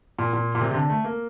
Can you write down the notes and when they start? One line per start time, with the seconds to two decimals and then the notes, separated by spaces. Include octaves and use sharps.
0.19 A#2
0.33 A#2
0.55 A#2
0.61 C3
0.71 C3
0.75 D3
0.90 A3
1.04 A#3